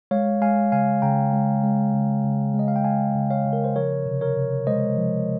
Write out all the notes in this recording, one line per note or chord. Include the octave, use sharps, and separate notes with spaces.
G#3 C#5 F5
G#3 F5 G#5
C#3 F5 G#5
C#3 G5 A#5
G#3
G#3
C#3
C#3
G#3
D#5
F5
G5
G#3 F5 G#5
C#3
C#5 F5
C#3
A#4
C5
F3 A#4 C#5
C3
A#4 C#5
C3
G#3 C5 D#5
F3